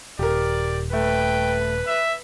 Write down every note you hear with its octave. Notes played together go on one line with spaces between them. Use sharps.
D#1 G4 A#4 D5
A3 B4 G5
E5